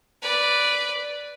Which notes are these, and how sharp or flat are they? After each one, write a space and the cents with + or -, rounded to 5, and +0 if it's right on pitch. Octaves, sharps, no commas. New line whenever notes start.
B4 +0 D5 -5